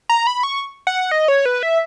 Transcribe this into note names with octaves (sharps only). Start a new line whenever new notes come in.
A#5
B5
C#6
F#5
D#5
C#5
B4
E5